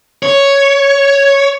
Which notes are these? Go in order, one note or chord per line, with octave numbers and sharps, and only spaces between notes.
C#5